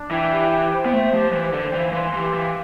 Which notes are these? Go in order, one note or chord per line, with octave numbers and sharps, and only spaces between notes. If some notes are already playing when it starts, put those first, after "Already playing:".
Already playing: D4
E3 G5
G4
G5
C5
B3
A3 C5
F3 G4
E3 C5
D3 C5
E3 F5
E3 C6
E3 G4
E3 F5